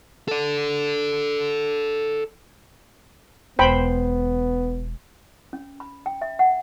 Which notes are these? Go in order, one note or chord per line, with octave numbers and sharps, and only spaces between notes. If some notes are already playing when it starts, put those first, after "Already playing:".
A4 D5
E1 B3 C5 G5 B5
C#4
B5
G5
E5
F#5